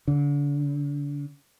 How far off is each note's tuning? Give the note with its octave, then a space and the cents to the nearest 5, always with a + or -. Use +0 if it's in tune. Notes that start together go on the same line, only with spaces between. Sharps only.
D3 -35